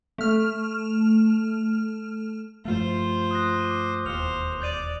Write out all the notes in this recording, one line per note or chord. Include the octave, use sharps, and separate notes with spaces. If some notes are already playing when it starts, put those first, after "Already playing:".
A3 F6
G2 F3 A3 F4 C5
D#6 F#6 A#6
D6 D#7
E1 D#2 C5 F6 C#7 F7
D5 G6 A6 D#7